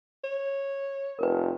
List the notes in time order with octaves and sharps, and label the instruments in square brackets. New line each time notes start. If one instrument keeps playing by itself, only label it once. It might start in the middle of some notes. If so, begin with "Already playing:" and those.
[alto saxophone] C#5
[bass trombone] F1 [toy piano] A#4 B4